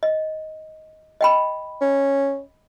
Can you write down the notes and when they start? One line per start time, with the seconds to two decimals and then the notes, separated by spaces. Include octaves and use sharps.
0.03 D#5
1.21 D#5 G5 B5
1.82 C#4